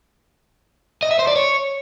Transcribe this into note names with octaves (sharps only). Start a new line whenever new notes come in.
D#5
E5
C5
D5
C#5